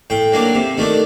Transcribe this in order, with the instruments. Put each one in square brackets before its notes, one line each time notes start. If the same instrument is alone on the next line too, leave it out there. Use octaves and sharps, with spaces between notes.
[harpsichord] A2 G5
F#3 A#3 D4
C3
D#3 A3 D4